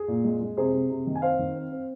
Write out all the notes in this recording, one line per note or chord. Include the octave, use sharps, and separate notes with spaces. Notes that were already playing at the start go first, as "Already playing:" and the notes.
Already playing: G#4
A#2
G#3
G#3
C3 G#4 C5
C3
C3
D#3
G#5
C4 C5 F5
D#3
C4
C4